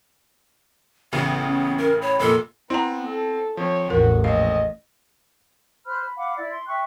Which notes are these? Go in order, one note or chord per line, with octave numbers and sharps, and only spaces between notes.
A1 C#3 B3
C#4
A#4
C#5 B5
F1 A#2 A4
B3 C4 E4 A#5
A4
F3 C4 C#5
A1 E2 A2 F#4 A#4
A#1 D#5 F5
C5 B5 F6 F#6
B5
F5 F#5 B5 D6
E4 D5
C6
E5 G5 C#6 F#6